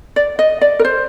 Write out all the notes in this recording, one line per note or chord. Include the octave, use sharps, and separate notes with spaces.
D5
D#5
D5
A#4
C5